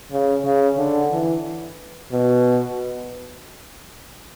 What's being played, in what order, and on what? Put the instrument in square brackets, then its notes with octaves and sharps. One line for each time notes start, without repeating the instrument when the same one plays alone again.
[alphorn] C#3
C#3
D3
E3
B2